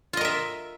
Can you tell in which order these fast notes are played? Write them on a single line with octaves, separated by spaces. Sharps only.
F4 D#5 A#4 E5